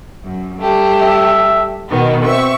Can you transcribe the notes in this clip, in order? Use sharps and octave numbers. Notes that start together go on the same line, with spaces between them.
F#2
G3 A3 G4
E5
B2 D#3 B3
C4 E5 C#6